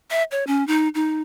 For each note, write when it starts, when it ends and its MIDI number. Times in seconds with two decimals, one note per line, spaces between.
0.11 0.23 76
0.31 0.44 73
0.47 0.66 61
0.67 0.88 63
0.95 1.22 63